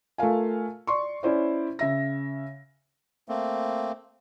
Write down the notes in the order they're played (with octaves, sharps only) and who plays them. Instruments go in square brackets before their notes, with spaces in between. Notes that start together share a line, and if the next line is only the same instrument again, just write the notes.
[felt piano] A3 F4 A#4 F5 G#5
D5 C6 C#6
C#4 E4 C5 D5
C#3 E5 A#6
[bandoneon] A3 A#3 C4